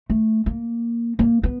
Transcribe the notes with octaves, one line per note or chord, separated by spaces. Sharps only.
A3
A#3
A#3
B3